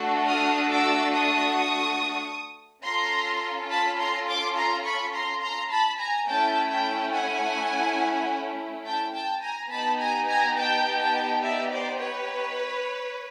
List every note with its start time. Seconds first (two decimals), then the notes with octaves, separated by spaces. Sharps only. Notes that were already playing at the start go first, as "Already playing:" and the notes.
Already playing: A3 D4 F#4 A4
0.27 D#6 F6
0.69 D6 E6
1.13 C#6 D#6
2.84 C#4 F4 A4 A#5 C6
3.70 A5 B5
3.99 A#5 C6
4.27 C6 D6
4.56 A#5 C6
4.85 B5 C#6
5.14 A#5 C6
5.41 A#5 C6
5.70 A5 B5
5.98 G#5 A#5
6.27 A3 C#4 E4 G5 A5
6.71 G5 A5
7.13 F#5 G#5
8.85 G5 A5
9.13 G5 A5
9.42 G#5 A#5
9.70 B3 D#4 G4 A5 B5
9.99 G#5 A#5
10.28 G#5 A#5
10.57 G5 A5
10.99 G5 A5
11.42 D5 E5
11.71 C5 D5
12.00 B4 C#5